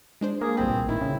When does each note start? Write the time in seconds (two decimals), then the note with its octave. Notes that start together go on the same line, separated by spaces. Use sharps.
0.21 G#3 D4 C5
0.41 A#3 G#4
0.57 G1 C2 C4 B4
0.70 A#1
0.89 A1 D#3 E4
1.02 C#3